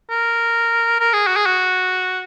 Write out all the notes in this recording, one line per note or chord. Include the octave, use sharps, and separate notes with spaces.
A#4
A#4
G#4
F#4
G#4
F#4